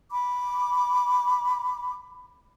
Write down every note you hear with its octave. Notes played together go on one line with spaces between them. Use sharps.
B5 D6